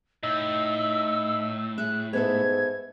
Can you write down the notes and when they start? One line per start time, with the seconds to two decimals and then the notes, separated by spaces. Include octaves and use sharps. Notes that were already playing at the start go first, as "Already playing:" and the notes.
0.23 A2 D#4 E6
1.78 G#4 E5 F#6
2.13 G#2 B3 A4 E5 G#6